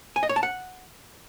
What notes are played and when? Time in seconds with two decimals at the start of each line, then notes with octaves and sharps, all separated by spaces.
0.16 G#5
0.23 D#5
0.29 C#5
0.36 A5
0.43 F#5